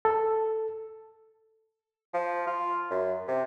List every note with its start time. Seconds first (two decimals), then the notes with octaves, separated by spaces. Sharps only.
0.05 A4
2.14 F3
2.47 F4
2.91 F#2
3.28 C3